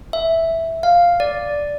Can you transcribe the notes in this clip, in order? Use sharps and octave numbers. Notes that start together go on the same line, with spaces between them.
E5
F5
D5